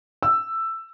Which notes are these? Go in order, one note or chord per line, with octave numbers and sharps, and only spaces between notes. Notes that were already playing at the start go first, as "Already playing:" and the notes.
E6